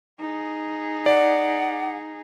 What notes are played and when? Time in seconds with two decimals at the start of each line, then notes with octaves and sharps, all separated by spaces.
0.20 D#4 G#4
1.06 D5 F#5